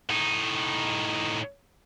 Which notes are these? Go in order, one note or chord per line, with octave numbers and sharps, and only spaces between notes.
A2 D#4